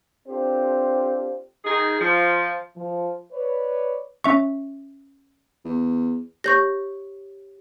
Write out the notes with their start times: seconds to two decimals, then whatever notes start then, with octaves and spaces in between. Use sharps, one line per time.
0.27 C4 D4 F4 G4 A4 C5
1.64 D#3 D#4 G#4
1.99 F3
2.77 F3
3.32 B4 C#5 D5
4.24 C#4 E5 C#6
5.65 E2
6.44 G4 C#5 C#6 G6 A#6